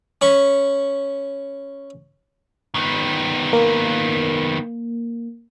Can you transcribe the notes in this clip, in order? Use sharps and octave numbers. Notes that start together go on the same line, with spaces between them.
C#4 B5 C#6
D#3 B3
A#3